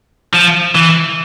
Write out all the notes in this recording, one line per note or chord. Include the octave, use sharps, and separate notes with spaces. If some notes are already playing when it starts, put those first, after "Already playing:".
F3
E3